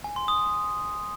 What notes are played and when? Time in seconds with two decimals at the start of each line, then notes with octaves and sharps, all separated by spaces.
0.04 G#5
0.16 C6
0.28 D#6